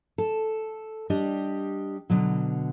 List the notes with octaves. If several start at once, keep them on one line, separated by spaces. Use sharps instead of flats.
A4
G3 D4 G4 D#5
B2 D3 F#3